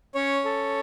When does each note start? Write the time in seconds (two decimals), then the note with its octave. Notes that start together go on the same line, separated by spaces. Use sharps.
0.15 C#4 C#5
0.45 A4